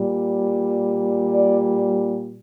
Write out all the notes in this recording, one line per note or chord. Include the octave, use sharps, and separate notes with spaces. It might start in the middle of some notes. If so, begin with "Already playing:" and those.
Already playing: A#2 G3
D5